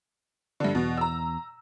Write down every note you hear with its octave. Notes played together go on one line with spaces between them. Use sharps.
G2 D3
E2 B2
A#5 E6